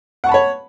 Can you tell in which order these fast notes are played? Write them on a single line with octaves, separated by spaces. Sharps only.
F#5 C#6 A5 B5 C#5